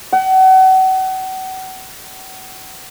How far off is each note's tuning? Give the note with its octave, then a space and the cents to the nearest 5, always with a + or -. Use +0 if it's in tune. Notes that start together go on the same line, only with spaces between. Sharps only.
F#5 +35